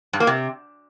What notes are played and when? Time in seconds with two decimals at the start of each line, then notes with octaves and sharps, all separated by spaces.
0.13 G2
0.20 A#3
0.27 C3